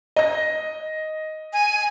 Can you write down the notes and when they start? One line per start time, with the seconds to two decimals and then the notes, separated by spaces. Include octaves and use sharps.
0.16 D#5 A#6
1.53 G#5